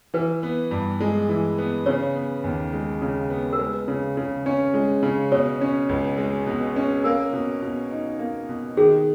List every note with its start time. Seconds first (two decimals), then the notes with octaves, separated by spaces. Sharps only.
0.14 E3 B4
0.43 B3
0.71 G2
1.00 G#3
1.29 E3
1.58 B3
1.86 C#3 C#5
2.16 B3
2.44 D#2
2.73 G#3
3.02 C#3
3.30 B3
3.53 A#4
3.59 G#3 B4
3.88 C#3
4.17 C#3
4.46 C#4
4.74 G#3
5.03 C#3
5.32 B2 C#5
5.61 C#4
5.89 C#2
6.18 G#3
6.47 B2
6.76 C#4
7.04 A#3 A#4
7.33 B2
7.62 B2
7.91 D#4
8.19 A#3
8.49 B2
8.77 D#3 G#4